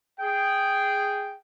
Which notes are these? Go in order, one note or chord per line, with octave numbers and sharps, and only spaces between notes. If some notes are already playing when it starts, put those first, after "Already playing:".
G#4 G5